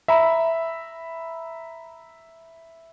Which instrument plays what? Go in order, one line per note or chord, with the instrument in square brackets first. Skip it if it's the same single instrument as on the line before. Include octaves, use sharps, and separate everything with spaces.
[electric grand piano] E5 A#5 B5